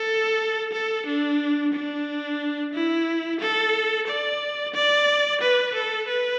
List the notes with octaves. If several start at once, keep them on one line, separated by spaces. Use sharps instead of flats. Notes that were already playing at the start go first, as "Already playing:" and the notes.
Already playing: A4
A4
D4
D4
E4
A4
D5
D5
B4
A4
B4